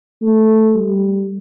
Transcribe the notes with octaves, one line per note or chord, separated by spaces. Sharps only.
A3
G3